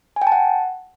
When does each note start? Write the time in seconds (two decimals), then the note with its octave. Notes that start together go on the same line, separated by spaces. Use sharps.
0.16 G#5
0.22 G5
0.27 A5
0.32 F#5